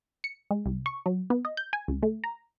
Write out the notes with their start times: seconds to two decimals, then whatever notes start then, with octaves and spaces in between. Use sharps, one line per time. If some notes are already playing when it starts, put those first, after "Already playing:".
0.24 C#7
0.51 G#3
0.66 C2
0.86 C#6
1.06 F#3
1.30 B3
1.45 D#5
1.57 G6
1.73 G#5
1.88 C#2
2.03 A3
2.24 A#5